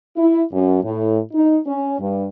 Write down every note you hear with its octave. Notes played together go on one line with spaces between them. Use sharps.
E4
F#2
A2
D#4
C#4
G2